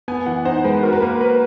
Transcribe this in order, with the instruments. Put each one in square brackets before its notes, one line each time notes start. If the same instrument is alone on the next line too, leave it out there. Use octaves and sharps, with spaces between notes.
[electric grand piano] B3 [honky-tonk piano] G#5
[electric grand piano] E3 [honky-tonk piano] F#5
[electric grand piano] D#4 [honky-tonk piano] C5
[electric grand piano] G#3 [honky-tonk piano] B4
[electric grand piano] F#4 [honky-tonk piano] A#4
[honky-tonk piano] B4
[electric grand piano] A#3 [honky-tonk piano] A#4
[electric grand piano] B4